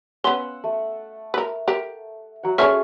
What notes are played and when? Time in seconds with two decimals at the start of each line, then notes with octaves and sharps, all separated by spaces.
0.24 B3 C#4 F#5 C6 E6
0.64 A3
1.34 A#4 B4
1.68 G4 A#4
2.43 F#3 F#5
2.58 C4 C#4 G#4 A4 C#5 E5 C#6 F6